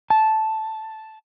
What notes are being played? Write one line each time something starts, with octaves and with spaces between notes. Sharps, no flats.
A5